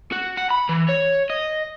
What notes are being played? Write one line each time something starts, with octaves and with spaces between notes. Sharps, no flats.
F#4
F#5
B5
E3
C#5
D#5